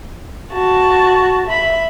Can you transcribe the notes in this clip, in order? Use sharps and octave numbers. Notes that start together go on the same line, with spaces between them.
F#4 A5
E5 B5